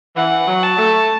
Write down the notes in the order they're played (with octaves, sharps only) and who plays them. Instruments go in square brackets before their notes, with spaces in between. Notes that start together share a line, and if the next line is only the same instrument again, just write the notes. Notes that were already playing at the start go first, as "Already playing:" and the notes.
[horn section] E3 [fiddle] F#5
[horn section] F#3
[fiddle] A5
[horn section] A3